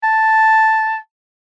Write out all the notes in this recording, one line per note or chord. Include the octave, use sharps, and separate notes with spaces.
A5